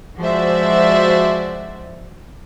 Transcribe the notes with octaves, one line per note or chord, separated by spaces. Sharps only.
F3 G#3 F#4 C5 D5 E5